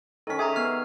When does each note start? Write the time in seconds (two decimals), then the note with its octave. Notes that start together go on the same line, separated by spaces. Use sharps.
0.27 D#3 C#4 A4 B6
0.39 G4 G#4 E5 G#5 A#5
0.56 B3 F6